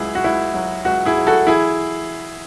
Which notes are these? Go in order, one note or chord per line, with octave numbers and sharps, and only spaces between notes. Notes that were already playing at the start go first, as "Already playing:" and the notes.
Already playing: C#2 F#3 E4 G#4
F#4
C#2 E4
F#3
C#2 F#4
E4 G#4
F#3
F#4 A4
E3 E4 G#4